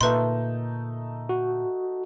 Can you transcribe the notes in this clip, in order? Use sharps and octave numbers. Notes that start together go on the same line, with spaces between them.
A#2 D3 A3 D#4 B4 C6
F#4